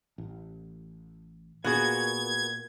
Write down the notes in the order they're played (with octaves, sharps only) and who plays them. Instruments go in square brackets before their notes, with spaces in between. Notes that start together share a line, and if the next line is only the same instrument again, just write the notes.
[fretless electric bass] A1
[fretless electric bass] A#2 [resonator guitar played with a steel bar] B3 F#4 G#4 [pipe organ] G#6